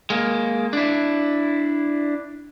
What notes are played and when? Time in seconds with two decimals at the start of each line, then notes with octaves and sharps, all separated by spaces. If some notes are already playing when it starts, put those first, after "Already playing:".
0.10 G#3 A#3
0.73 D4 E4